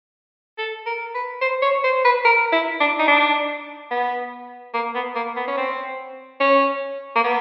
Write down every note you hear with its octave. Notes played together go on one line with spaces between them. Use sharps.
A4
A#4
B4
C5
C#5
C5
B4
A#4
E4
D4
D#4
D4
B3
A#3
B3
A#3
B3
C#4
C4
C#4
A#3
B3